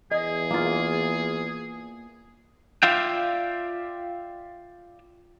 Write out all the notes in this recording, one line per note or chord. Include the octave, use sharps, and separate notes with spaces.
E2 G#4 D#5
A#3 F4
F4 D5 E5 F5 G5